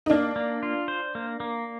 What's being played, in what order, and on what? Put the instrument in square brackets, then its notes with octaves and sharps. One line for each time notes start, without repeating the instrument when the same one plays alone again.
[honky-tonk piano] D#4
[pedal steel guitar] A#3 [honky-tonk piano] D4
[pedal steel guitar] A#3
F4
C5
A#3
A#3